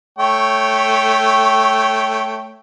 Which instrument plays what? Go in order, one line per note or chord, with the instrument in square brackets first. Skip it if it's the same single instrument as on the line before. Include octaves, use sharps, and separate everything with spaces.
[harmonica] A3 C#5 G5